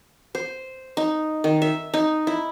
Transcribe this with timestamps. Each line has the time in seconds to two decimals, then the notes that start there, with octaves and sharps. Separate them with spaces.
0.35 C5
0.97 D#4
1.44 D#3
1.62 E5
1.94 D#4
2.27 E4